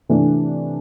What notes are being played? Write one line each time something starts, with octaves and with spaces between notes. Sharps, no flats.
C3 E3 A3 D4